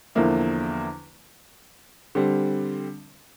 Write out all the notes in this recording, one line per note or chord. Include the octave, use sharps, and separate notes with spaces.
E2 D3 F3 A#3 E4
D3 G3 C4